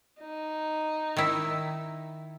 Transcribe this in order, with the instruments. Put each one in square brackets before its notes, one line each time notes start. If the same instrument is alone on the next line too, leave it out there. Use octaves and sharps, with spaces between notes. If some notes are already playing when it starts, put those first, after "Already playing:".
[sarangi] D#4
[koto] D#3 E4